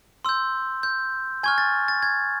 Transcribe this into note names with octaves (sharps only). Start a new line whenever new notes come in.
C6 E6 G6
G6
G#5 C#6 F6 G#6
A6
A6
G#6